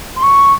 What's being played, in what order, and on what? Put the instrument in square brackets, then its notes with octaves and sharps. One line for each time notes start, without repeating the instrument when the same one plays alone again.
[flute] C6
C#6